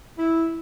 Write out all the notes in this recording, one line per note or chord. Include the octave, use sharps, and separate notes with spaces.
E4